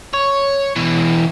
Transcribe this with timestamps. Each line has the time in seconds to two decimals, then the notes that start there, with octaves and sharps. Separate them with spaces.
0.14 C#5
0.76 B2 E3